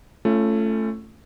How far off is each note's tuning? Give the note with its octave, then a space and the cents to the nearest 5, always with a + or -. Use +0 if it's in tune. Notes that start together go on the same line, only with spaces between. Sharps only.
A3 +0 C#4 -10 F4 -35